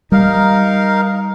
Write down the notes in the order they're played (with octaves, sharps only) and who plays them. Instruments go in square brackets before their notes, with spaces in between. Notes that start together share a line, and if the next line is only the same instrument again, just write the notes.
[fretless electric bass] G3 [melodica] D#4 A#4 F5